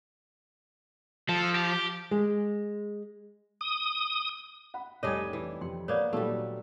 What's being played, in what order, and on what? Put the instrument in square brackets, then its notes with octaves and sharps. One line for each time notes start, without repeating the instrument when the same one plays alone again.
[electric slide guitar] F3 [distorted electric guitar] A4
[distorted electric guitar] G4
[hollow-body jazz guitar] G#3
[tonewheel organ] D#6
[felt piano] F#5 B5
[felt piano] F1 G#5 G#6 [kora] G3 D4 D#5 [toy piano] A4 C#5
[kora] E3
[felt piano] F2 C3 [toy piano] G5 C6
[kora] A#3 B3 [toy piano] C#5 D5
[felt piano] A#2 D#3 F#3 [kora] G3 A3